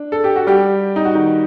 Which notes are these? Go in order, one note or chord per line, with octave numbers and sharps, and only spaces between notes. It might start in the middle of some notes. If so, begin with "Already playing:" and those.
Already playing: D4
A4
G4
F#4
G3 G4
D#4
F#4
D#3 D#4